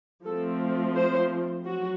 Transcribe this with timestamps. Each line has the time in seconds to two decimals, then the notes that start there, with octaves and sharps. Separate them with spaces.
0.25 F3 A3 C4 A4
0.95 C5
1.66 F#3 F#4